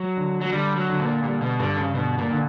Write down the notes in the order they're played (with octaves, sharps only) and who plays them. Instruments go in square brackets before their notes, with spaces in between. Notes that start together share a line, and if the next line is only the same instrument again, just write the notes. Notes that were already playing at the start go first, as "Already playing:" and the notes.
Already playing: [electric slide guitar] F#3
[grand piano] D3
[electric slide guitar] F#3
[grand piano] D3 [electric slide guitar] G3
[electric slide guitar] F#3
[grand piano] D3
[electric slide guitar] A#2
[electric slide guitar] A#2 [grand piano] G3
[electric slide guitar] B2
[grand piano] G2 [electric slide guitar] D3
[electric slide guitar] C#3
[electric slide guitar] B2 [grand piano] D3
[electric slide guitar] A#2
[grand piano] D3